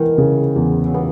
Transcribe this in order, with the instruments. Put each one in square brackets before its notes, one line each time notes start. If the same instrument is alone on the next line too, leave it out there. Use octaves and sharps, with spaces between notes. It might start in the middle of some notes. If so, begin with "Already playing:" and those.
Already playing: [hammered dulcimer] D#3 [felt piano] E3 B3
[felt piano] C#3
E2
[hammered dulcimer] F#3
[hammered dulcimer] E3 [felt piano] B3